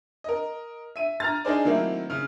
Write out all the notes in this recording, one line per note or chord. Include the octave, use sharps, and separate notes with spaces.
A#4 D#5
E5 D#7
A#5 F6 A6
D4 D#4 G#4 C5 D5
D#3 F#3 A3 A#3 C4 E4
C#3 F6